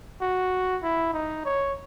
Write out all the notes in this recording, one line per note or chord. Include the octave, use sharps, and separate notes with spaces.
F#4
E4
D#4
C#5